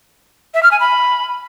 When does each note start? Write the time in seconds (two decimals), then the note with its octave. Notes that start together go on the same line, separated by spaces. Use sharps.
0.54 E5
0.63 F6
0.72 G#5
0.80 B5